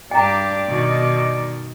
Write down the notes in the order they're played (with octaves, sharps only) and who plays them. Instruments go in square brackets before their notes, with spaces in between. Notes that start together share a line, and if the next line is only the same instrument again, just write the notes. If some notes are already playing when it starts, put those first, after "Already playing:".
[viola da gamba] G2 D4 G4 [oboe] D5 [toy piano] G5 A#5
[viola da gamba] B2 D#3 D#4